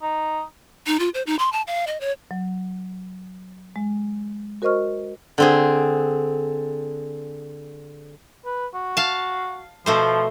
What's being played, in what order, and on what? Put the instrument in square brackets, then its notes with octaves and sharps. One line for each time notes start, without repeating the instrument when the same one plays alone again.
[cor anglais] D#4
[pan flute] D#4
F4
C5
D#4
C6
A5
F5
D#5
C#5
[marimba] F#3
G#3
F#4 A#4 C5 D#5 C#6 F6
[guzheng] D3 C4 G#4
[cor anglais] B4
F#4
[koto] F5 A5
[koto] B2 A3 C5 [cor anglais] F3